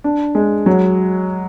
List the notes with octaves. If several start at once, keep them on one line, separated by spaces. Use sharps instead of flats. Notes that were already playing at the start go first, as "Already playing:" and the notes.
D4
G#3
F#3